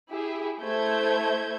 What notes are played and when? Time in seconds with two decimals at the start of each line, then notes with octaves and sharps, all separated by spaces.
0.11 E4 G4 G#4 E5
0.62 A3 E4 C5 E5 G6 G#6